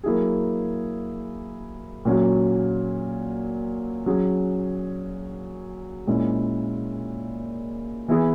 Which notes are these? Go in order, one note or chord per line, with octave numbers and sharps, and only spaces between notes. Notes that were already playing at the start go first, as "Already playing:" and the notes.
F#3 A#3 E4 G#4
A#2 F#3 C#4 F#4
F#3 C#4 G#4
A#2 G#3 C#4 E4
E3 B3 E4 G#4